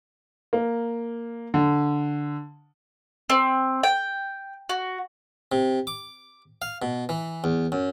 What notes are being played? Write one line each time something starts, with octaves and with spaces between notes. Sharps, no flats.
A#3
D3
C4
G5
F#4
C3
D6
F5
B2
E3
E2
F#2